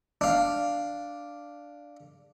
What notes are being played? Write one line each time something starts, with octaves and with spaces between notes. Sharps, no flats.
D4 F5